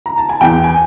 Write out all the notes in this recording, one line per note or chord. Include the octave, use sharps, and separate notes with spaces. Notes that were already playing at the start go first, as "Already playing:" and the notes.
A#5
A5
G#5
E2 G5
G#5